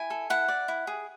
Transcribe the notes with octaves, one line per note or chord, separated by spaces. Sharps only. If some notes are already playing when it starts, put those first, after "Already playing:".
Already playing: E4 G#5
A4
E4 F#5
D5
E4
G#4